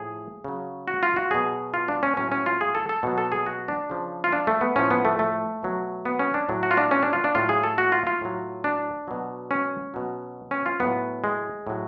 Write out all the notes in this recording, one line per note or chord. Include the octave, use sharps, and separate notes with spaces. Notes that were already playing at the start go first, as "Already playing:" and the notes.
Already playing: A2 F3 G#4
C#3 F#3
F#4
F4
F#4
B2 F#3 G#4
F4
D4
C#4
A2 F#3 C#4
C#4
F4
G#4
A4
A4
B2 F#3
A4
G#4
F#4
D4
C#3 F3
F4
D4
A3
B3
A2 F3 C#4
B3
A3
A3
B2 F#3
B3
C#4
D4
A2 F#3
F#4
F4
D4
C#4
D4
F4
D4
A2 F#3 F4
G#4
A4
F#4
F4
F4
A2 F#3
D4
B2 F#3
C#4
B2 F#3
C#4
F4
A2 F#3 B3
G#3
A2 F#3